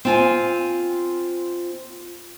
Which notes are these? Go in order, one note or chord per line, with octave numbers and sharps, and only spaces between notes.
C4 F4 G#5